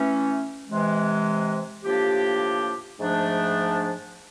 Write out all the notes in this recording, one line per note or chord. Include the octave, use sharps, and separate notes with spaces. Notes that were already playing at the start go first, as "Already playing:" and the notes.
Already playing: E3 A3 C#4
C3 E3 G#3
A2 F3 A#3 D4 G4
G#2 F3 A3 D4